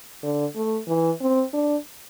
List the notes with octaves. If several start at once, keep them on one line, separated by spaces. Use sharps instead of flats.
D3
A3
E3
C4
D4